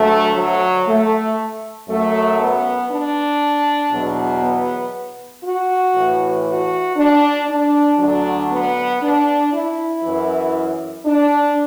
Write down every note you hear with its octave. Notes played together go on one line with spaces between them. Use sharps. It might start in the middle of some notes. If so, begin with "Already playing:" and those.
Already playing: D2 D3 F#3 A3
F#3
A3
F#2 F#3 A3
B3
D4
E2 B2 F#3
B3
F#4
A2 E3
F#4
D4
D4
D2 D3 F#3 D4
B3
D4
E4
F#2 E3
D4